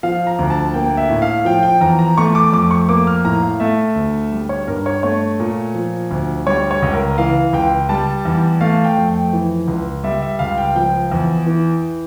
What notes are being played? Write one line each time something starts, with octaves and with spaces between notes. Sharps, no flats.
F3 F5
A#5
D2
A5
A#3 G5
E5
A2
F5
F3 G5
G5
E2 A#5
A#5
A3 C#6
D6
F2 D6
C#6
A#3 D6
F6
A2 A#5
F5
A3 E5
D2
G3
C#5
G2 A#4
C#5
A3 C#5
A#2
F3
D2
G3 C#5
C#5
C#2
A#4
E3 F5
C#2 G5
G3 A5
E2
A3 F5
G5
F2
G5
E3
C#2
G3 E5
E5
C#2 F5
G5
F3 G5
E2
E3